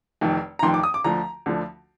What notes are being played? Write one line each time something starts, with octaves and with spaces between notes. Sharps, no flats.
F1 F2 D#3
A#5
F1 F2 D#3 C6
D6
D#6
D6
D2 D3 F3 A#5
D2 D3 F3